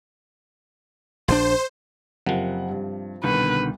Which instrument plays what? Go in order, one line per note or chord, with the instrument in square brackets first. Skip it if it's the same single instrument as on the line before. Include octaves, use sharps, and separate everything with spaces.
[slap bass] A#1 D3 D4 [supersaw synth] C5
[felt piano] F#1 F#5 [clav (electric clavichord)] C3 F3
[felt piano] G2
[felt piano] C2 [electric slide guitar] B2 D3 D#3 [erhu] B4